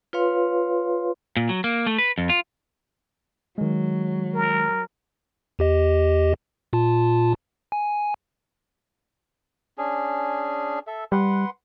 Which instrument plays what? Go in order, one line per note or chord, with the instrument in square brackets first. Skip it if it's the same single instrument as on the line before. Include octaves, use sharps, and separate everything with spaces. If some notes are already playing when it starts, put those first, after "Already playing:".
[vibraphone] F4 B4 C#5 F5 C6
[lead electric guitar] A#2
F#3
A#3
A3
B4
F2
F4
[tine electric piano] D#3 G#3 [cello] F#3
[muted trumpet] A#4
[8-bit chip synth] E2 G4 D#5
A#2 F4 A5
G#5
[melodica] C#4 D4 G#4
A4 E5
[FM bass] G3 [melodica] B4 F#5 C6